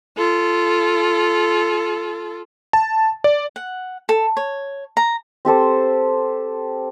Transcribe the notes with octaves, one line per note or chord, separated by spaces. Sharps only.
F4 A4
A5
D5
F#5
A4
C#5
A#5
C4 G4 A4 C5